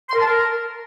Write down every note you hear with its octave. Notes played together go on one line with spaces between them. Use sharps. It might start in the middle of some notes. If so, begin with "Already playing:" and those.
C6
A#4
A5
A#4